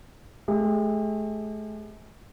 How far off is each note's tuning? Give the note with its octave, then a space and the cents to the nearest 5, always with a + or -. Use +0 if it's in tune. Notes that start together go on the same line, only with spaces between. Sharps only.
A3 -45 G4 +45